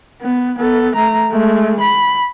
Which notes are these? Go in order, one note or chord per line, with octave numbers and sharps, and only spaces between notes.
B3
B3 A4
A3 A#5
G#3 A3
B5